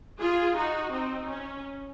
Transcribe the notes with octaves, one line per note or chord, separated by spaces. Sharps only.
F4 G#4
D#4 F#4
C4 D#4
C#4